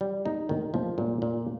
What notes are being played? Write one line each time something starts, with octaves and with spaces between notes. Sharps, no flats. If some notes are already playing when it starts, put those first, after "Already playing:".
G3
D#4
D#3
F3
A#2
A#2